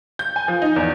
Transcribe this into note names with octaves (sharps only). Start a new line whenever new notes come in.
G6
G#5
F3
D#4
E2